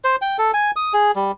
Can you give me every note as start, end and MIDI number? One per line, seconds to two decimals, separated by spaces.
0.04 0.16 72
0.22 0.37 79
0.39 0.51 69
0.54 0.71 80
0.76 0.93 87
0.93 1.11 68
1.16 1.32 55